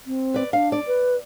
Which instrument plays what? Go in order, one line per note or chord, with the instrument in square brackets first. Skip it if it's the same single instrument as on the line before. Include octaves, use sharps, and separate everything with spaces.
[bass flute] C4
[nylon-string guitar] B4 D5
[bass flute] D4 [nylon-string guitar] F5
[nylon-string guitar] D5
[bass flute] B4